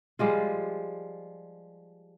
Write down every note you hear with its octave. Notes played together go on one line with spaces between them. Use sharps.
F3 G3 G#3 F4